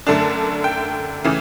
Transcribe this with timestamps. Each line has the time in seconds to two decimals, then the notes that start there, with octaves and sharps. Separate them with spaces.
0.07 F#2 D3 A3 D4 A5
0.64 G5
1.24 C#3 E3 A3